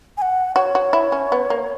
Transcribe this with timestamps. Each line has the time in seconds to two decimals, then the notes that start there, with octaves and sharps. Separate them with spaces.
0.17 G#5
0.22 F#5
0.55 F#4 C#5
0.75 F#4
0.93 E4
1.12 C#4
1.32 B3
1.50 A#3